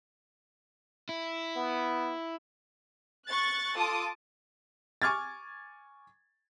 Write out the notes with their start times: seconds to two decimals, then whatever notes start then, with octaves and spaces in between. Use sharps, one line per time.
1.09 E4
1.56 B3
3.26 C#6 F#6 A6
3.75 F4 A4 A5 D6 D#6
5.02 G#5 C#6 D6 F6 G#6 A6